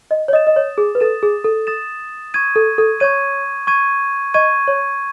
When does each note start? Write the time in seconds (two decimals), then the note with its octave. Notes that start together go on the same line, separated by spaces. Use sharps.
0.11 D#5
0.28 C#5
0.33 D#5 D#6 A6 E7
0.47 D#5
0.56 C#5
0.78 G#4
0.95 B4
1.00 A4 D#6 A6 E7
1.23 G#4
1.44 A4
1.67 D#6 A6 E7
2.34 C#6 G#6 D#7
2.56 A4
2.78 A4
3.00 C#5 C#6 G#6 D#7
3.67 C#6 G#6 D#7
4.34 D#5 C#6 G#6 D#7
4.68 C#5